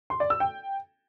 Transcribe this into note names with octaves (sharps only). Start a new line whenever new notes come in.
C6
D5
E6
G5